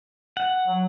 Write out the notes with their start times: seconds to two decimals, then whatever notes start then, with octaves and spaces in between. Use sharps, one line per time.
0.37 F#5
0.67 F#3